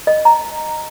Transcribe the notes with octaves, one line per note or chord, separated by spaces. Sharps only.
D#5
A#5